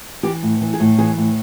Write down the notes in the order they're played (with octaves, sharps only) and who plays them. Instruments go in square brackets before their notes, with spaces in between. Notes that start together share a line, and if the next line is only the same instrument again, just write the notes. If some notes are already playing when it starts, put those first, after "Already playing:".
[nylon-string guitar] E3 G4
A2
E3
G#4
A2
E3 G#4
A2